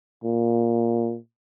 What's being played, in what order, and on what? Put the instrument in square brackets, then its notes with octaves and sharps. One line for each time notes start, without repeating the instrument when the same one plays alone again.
[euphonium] A#2